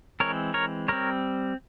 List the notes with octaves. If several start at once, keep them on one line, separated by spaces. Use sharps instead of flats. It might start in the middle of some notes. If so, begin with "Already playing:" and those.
E3 G#3 C4 A#4 C#5
A#4 C#5
G3 C4 A#4 C#5